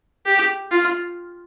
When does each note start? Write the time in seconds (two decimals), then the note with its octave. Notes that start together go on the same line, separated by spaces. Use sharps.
0.26 G4
0.72 F4